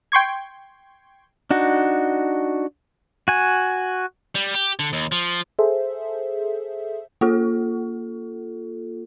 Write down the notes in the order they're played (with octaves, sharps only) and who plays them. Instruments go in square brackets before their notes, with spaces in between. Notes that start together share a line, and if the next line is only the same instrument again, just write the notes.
[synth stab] G5 C6 C#6 G#6
[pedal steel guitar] D4 D#4 F#4
F#4 G#5
[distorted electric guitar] G3
G4
D3
D#2
F3
[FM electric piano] G#4 A4 C5 E5
[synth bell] A#3 F4 A4